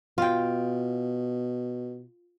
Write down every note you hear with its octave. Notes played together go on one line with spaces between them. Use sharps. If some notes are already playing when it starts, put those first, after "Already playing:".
B2 F4 G5